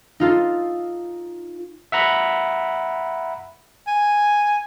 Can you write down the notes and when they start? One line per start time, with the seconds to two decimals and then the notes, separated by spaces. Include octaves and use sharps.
0.20 D#4 F4 A4
1.92 E5 F#5 A#5 B5
3.87 G#5